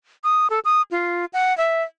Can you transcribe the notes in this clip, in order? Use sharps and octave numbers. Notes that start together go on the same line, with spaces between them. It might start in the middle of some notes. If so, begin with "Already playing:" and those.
D#6
A4
D#6
F4
F#5
E5